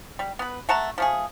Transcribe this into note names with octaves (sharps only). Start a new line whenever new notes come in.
G3
B3 B4
A3 F#5 A5 A#5
F3 A3 G#4